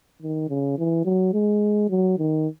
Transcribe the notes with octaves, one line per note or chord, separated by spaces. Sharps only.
D#3
C#3
E3
F#3
G#3
F#3
D#3